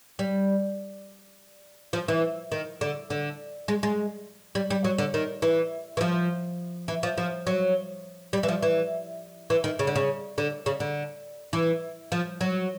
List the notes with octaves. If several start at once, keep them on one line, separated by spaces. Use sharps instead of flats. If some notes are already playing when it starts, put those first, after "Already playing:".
G3
F3
E3
D#3
D3
D3
G#3
G#3
G3
G3
F#3
D3
D#3
E3
E3
F3
E3
F3
F3
F#3
G3
E3
F3
E3
E3
D#3
C#3
D3
C#3
D3
C#3
D3
E3
F3
F#3